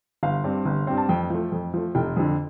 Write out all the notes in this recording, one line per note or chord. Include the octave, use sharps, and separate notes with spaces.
G1 F5
G2 G3 C4
G1
G2 G3 C4
A5
F2 G5
F3 A3
F2
F3 A3
F1 G5
F2 D3